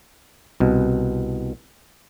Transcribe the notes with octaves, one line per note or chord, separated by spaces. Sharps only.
C2 B2